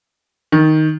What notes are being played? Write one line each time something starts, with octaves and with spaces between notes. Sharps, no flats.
D#3